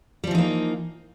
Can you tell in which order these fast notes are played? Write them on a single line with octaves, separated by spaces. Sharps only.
G3 F3 E3 D#4 A#3